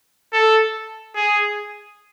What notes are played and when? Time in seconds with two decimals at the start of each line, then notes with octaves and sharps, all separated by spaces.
0.33 A4
1.16 G#4